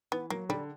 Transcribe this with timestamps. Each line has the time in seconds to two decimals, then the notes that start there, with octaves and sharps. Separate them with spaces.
0.12 E3 B3
0.30 F#3 A#3
0.49 D3 G3